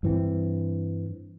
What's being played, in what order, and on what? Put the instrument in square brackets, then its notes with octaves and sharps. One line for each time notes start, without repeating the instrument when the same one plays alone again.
[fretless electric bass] G2 E3 C4